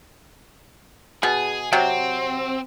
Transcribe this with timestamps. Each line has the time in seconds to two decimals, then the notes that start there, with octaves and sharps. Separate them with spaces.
1.23 B2 G#4
1.73 C3 F#3 C4